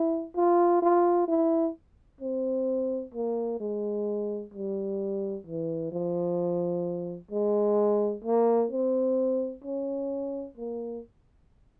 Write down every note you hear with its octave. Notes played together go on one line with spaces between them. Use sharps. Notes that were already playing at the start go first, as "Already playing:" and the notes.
Already playing: E4
F4
F4
E4
C4
A#3
G#3
G3
E3
F3
G#3
A#3
C4
C#4
A#3